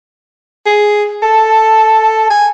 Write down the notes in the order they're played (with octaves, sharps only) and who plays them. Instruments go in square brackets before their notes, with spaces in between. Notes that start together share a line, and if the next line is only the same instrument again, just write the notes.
[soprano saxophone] G#4
[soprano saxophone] A4 [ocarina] A5
[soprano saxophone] G#5